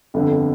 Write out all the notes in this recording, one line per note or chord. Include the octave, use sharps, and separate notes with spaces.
G1 F2 D3